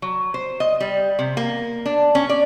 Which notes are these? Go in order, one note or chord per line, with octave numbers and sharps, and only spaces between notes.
F#3
C5
D#5
G3
C3
A#3
D4
C#4
D5